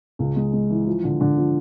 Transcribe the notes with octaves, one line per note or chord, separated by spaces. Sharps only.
C#2
G#3
G#3
E3
F3
D3
D3
F3